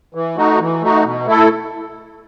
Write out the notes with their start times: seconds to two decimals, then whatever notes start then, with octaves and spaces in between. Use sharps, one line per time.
0.15 E3
0.37 A3 D#4 F#4
0.60 E3
0.82 A3 D#4 F#4
1.04 B2
1.26 A3 E4 A4